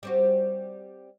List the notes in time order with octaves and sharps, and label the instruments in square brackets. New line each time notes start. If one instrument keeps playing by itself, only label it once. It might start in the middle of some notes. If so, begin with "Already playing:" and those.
[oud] G3 C4 F#4